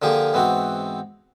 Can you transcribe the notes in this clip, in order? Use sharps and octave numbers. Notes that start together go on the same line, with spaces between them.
D3 F3 A#3 G4 G#4
G#2 E3 B3 C4 F#4